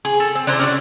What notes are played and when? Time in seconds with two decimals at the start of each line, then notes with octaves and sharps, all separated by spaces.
0.05 G#4
0.20 A4
0.35 C4
0.47 D4 E4 C5 A#5
0.59 C#4 D4 F#4